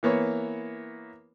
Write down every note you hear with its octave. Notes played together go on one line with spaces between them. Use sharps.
E3 A#3 B3 C#5